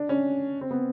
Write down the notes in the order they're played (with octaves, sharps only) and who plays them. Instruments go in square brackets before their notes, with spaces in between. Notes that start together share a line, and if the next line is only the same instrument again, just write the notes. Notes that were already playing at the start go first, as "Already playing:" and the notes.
Already playing: [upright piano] D4
C#4
C4
B3